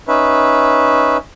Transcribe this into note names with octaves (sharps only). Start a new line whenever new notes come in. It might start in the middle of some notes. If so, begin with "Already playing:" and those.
C#4 D#4 B4 E5